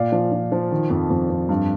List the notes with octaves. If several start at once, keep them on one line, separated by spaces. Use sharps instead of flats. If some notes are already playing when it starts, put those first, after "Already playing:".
Already playing: A#2 D5 F5
F3
F3
F3
D#3
F2
F2
F2
G2